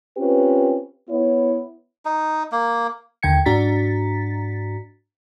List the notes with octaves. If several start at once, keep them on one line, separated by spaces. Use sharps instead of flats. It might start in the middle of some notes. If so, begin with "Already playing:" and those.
C4 C#4 F4 G4 B4
B3 E4 C#5
D#4
A#3
D#2 D3 G5 G#6 C#7
G#2 D4 F#4 A#5 A6 B6